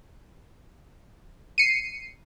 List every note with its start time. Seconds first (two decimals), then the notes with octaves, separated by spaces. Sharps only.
1.58 C7 C#7 D#7